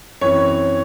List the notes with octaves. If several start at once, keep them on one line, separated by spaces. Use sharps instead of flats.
F#2 E3 C4 C#5